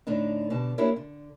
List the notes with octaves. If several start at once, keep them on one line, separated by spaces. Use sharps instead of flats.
A2 D3 D4 D#4
B2 D3 G4 A5
A#3 D4 E4 G4 A#4 C#5
D3